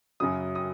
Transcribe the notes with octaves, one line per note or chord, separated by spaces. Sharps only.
F#2 C#3 F#3 D#6
D#6